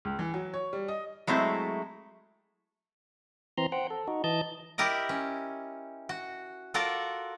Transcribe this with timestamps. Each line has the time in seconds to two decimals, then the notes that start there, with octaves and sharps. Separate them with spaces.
0.05 C#2
0.19 E3
0.34 F#3
0.54 C#5
0.73 G3
0.88 D#5
1.27 F#3 G#3 A3 C4 E4
3.58 E3 C4 A#5 C6
3.72 C5 F#5 G5
3.90 A4
4.08 D#4 F#4
4.24 E3 D#5 A5 G6
4.78 E4 G4 A#4 D5 D#5
5.09 C#4
6.09 F#4
6.74 F4 F#4 A4 A#4 D5